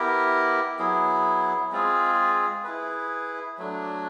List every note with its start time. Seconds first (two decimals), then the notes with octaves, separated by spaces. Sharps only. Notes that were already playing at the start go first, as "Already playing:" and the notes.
Already playing: B3 E4 G4 A#4
0.79 F#3 B3 E4 G#4
1.72 G#3 C4 F4 G#4
2.64 E4 G#4 B4
3.58 F#3 A3 D4